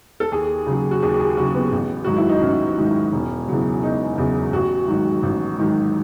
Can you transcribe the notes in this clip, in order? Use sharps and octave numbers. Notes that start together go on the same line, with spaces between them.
A4
D#2 G#4
C#3 F#3
F#4
D#2 G#4
G#4
C#3 F#3 F#4
B3
A1
G#2 D#3 F#3 F#4
E4
D#4
A1 C#4
G#2 D#3 F#3
E1
E2 C#3 F#3
E1 D#4
E2 C#3 F#3
A1 F#4
G#2 D#3 F#3
A1
G#2 D#3 F#3